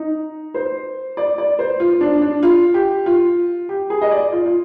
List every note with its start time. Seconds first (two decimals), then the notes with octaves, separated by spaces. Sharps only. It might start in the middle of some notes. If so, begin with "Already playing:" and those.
Already playing: D#4
0.54 C5
1.17 D5
1.38 D5
1.59 C5
1.80 F4
2.01 D4
2.22 D4
2.43 F4
2.74 G4
3.06 F4
3.69 G4
3.90 G#4
4.01 D#5
4.11 D5
4.32 F4
4.46 F4